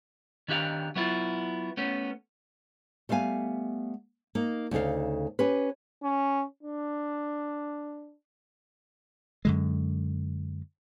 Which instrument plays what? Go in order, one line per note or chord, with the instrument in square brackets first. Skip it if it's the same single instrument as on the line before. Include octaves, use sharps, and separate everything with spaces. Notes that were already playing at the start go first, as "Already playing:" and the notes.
[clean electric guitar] D#3 D4 G4 F5
F#3 B3 E4 F4
A3 B3 C#4
[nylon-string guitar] G3 A3 B3 F5 G#5
A#3 D#4
D2 C#3 D#4 A4 F5
C#4 G4 B4
[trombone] C#4
D4
[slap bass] F#2 D3 G#3